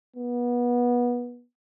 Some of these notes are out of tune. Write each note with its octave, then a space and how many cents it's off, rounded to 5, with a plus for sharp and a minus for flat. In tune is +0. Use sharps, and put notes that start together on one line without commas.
B3 -25